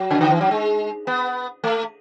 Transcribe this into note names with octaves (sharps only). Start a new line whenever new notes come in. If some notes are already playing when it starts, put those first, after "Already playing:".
Already playing: F#3
C#3
D3
E3
F#3
G#3
B3
A3